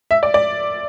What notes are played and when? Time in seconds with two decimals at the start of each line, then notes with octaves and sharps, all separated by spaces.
0.11 E5
0.23 D5
0.34 D5